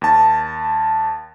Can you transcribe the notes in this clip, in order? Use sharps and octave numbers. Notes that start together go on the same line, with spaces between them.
D#2 A5